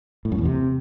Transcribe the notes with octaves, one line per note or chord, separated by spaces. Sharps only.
A2
F#2
E2
C3